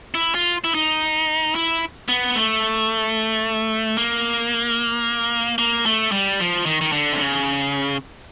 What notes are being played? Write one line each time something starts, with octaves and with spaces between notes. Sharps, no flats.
E4
F4
E4
D#4
E4
B3
A3
A#3
A#3
A3
G3
F3
D#3
D#3
D3
C3
C#3